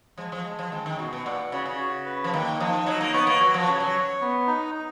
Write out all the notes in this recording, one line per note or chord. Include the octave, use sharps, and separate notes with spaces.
F3 G#3
F3
G#3
F3
D#3 G#3
D#3
B2 F#4
B2
A#2 F#5
C#3 F#4
C#3
F#4
B4
F3
D#3 A#3
F3 D#4
F#3 D#4
A#3
B3 C#5
A#3
F#3 F#4
F3
C#3 C#5
F#3
C#5
B3
D#4
D#4